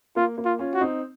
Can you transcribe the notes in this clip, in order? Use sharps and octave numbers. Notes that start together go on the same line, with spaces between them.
A#3 F4
A#3
F4
C#4 F4
F#4
C4 D#4